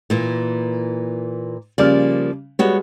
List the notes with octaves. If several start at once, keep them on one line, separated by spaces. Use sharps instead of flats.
A#2 E3 A#3
C#3 F3 G3 A#3 D5 F6
G3 G#3 B3 F#4 C#5